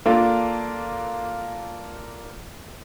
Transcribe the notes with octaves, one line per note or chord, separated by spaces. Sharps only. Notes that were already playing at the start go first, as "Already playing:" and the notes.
A#3 D4 F4 A4